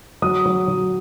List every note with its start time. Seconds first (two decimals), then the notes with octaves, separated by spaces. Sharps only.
0.22 F#3 D#6
0.46 F#3
0.68 F#3